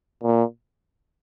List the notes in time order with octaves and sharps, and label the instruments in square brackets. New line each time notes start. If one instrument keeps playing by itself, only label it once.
[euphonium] A#2